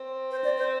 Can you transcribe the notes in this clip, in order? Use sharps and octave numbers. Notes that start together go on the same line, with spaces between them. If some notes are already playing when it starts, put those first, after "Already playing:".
Already playing: C4
C5
D5
C5